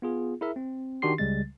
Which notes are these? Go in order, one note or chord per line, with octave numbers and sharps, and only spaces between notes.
B3 F4 G#4
E4 G#4 A#4 E5
C4
D#3 D4 F#4 G4 C6 C7
C#2 C#3 G3 G#3 A6